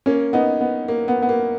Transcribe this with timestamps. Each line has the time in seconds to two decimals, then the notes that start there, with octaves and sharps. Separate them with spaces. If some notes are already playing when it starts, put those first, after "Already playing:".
0.06 A#3 C#4
0.33 B3 D#4
0.61 B3
0.88 A#3
1.08 B3
1.22 B3
1.29 A#3